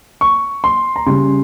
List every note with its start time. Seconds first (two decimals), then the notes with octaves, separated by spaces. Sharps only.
0.21 C#6
0.64 C6
0.96 A#5
1.06 C#3 G3 C#4 C6